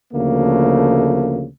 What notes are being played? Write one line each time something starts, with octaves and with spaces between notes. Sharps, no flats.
D2 C#3 F3 A3 A#3